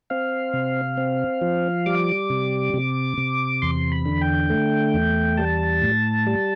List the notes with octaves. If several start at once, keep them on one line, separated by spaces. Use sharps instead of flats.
C4 F5
C3
C4
F3
G3 D6
C3
C3
C3
E2 C6
B5
D3
G5
A3
E2
G3 A5
A2
G3